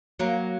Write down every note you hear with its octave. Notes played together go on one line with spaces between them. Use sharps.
F#3 A#3